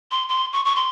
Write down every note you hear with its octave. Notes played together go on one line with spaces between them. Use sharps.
C6
C6
C#6
C#6
C6